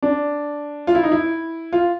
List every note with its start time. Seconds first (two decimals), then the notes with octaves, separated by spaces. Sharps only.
0.02 D4
0.87 F4
0.95 E4
1.03 D#4
1.12 E4
1.73 F4